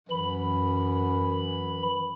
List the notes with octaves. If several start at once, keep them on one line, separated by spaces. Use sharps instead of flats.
F#2 E3 B5